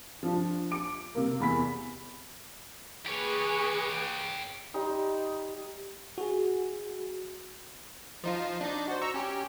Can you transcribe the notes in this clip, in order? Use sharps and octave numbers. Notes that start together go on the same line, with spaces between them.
F3 D4
D6 C#7 D7
C3 G3 A#3
E2 B5 B6
G4 G#4 B4 C#5
G3 D#4 C6
F#4 G#4
F3 D#4 F4
D4 D#4 D5
F#4 C5
A#5 C#6 E6
C#4 G4